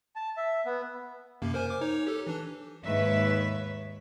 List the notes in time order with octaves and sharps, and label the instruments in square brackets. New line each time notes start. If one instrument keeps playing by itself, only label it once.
[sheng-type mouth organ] A5
E5
B3
[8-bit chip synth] F#2 C3 A#3
A#4 C5 G#5
A#4 D6
D#4 C#5
G4 A4
E3 D4
[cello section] D#2 G#2 B4 C#5 E5